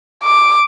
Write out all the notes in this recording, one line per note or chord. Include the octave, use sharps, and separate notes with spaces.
D6